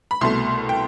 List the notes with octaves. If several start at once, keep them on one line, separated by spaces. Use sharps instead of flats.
B5
C2 B2 A3 C6
G5